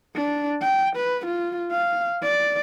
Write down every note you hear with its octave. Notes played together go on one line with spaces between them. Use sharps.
D4
G5
B4
F4
F5
D5